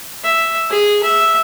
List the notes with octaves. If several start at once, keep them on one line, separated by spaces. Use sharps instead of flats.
E5
G#4
E5